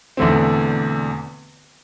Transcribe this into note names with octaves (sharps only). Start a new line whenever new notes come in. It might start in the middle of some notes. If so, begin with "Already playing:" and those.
E1 E2 D3 A3 C4